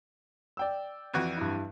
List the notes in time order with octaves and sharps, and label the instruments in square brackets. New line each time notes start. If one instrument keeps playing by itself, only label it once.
[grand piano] D5 G5 E6
[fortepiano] F2 E3 F#4
[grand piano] G2 E4